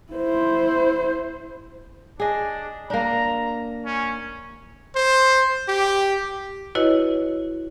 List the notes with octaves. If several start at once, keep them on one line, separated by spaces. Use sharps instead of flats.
E4 C5
D4 G#4 D#5
A#3 D4 A#5
C#4
C5
G4
E4 F#4 B4 C#5 D#5